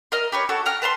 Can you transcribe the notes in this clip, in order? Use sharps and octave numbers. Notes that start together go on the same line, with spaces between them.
A#4 D#5 F6
G4 B4 C#5
F#4 A4
G5 A#5 F6 F#6
B4 A5 A#5 C6